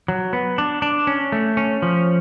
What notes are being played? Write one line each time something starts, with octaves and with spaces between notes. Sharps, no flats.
F#3
B3
D4
D4
C#4
A3
C#4
F3